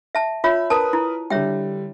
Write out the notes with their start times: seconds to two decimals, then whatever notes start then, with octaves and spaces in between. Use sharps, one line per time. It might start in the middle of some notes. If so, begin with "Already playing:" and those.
0.15 E5 A5
0.44 F4 C#5 E5 B5
0.70 A#4 B4 A5 D#6
0.93 E4
1.30 D3 G3 C#5 E5 G5